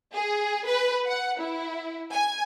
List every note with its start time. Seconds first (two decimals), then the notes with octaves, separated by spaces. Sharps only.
0.14 G#4
0.66 B4
1.07 F#5
1.40 E4
2.12 G#5